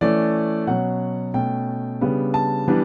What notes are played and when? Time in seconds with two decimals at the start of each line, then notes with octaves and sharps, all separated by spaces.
0.01 E3 A3 C#4 D5
0.67 B2 F#3 C#4 F#5
1.34 B2 A3 C#4 G5
2.01 C#3 G3 B3 D4
2.34 A5
2.68 E3 G3 B3 D4